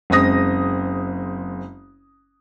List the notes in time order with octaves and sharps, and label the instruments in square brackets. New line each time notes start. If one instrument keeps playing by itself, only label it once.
[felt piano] F#1 G#3 C4 D#6 A#6